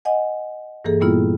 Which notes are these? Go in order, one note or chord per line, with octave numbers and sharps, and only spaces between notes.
D#5 F#5 G#5
G2 E3 A#3 G#4 A4
A#2 G3 A#3 B3 E4 F4